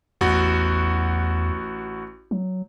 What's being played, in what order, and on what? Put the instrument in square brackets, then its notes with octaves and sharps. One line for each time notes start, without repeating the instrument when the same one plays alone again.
[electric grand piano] A1 F#4 [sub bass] E2
[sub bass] F#3